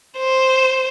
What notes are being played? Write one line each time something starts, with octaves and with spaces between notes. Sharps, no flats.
C5